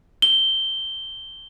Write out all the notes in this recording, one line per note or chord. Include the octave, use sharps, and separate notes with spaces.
G7